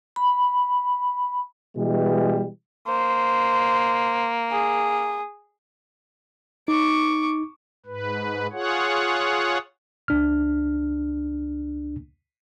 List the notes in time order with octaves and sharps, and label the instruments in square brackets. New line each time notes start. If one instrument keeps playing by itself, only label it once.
[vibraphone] B5
[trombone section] B2 E3 G3 G#3
[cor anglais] A#3 [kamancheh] C5
[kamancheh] G#4
[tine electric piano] D#4 [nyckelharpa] C#6 D6
[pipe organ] G#2 B4
F4 G#4 C#5 F#5
[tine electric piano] C#2 D4 F6